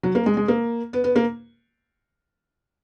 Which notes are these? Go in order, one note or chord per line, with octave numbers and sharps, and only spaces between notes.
F#3
A#3
G#3
G#3
A#3
B3
B3
A#3